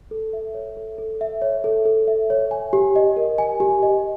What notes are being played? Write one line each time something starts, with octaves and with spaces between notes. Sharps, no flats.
A4
E5
C#5
A4
A4
E5
C#5
A4
A4
E5
C#5
G#5
G4
D#5
A#4
G#5
G4
D#5